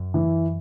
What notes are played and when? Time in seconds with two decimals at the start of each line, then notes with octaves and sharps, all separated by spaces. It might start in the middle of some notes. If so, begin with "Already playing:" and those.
Already playing: F#2
0.14 E3